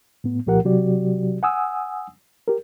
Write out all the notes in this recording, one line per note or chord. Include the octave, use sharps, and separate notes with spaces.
A2 B3
C2 A#2 F3 G4 A#4 F#5
C3 F#3 F#4 G4 D5
F#5 G#5 D#6 E6
G4 A#4